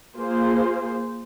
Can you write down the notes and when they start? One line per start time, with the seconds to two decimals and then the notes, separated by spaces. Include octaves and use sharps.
0.17 A#3 F4 G#4 C5